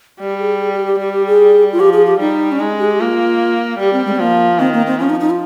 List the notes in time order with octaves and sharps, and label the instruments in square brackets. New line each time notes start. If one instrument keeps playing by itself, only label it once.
[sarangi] G3 [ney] G4
[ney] G#4
G#4
G4
G4
[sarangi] G3 [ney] G4
[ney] G4
G#4
F4
[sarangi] F3 [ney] G4
[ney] G#4
G4
[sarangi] G3 [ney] D#4
[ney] C#4
[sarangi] G#3 [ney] D#4
[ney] G4
G#4
G4
[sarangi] A#3 [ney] F4
[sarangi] G3 [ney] G4
[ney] C4
G#3
C4
[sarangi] F3 [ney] A#3
[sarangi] D#3 [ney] C4
[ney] A#3
C4
[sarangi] F3 [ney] C#4
[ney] D#4
D#4
F4